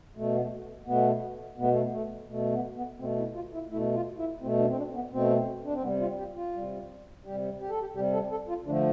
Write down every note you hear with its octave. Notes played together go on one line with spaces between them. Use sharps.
B2 A3
B3
A3
B2 A3 B3
B2 A3 B3
A3
A3
B2 A3
B3
B3
B2 A3 C4
E4
F4
E4
B2 A3 E4
F4
E4
B2 A3 C4
D4
C4
D4
B3
B2 A3 C4
D4
C4
C3 G3 B3
F4
G4
F4
C3 G3
C3 G3 G4
G4
A4
G4
C3 G3 G4
A4
A4
F4
D3 F3 A3 D4